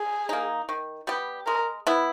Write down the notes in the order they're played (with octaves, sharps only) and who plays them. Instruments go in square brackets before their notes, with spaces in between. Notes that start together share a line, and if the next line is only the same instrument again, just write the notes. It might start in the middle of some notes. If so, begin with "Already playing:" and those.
Already playing: [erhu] G#4
[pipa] A#3 D#4
D#3
G3 B3 G4
[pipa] G#3 [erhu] A#4
[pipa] B3 E4